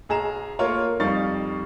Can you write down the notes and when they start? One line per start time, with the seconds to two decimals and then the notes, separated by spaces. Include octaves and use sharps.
0.09 B1 G#4 A#5 E7
0.59 A3 A#3 F4 A#4 C#5
1.00 F2 G3 D#4 F5 C#6 A6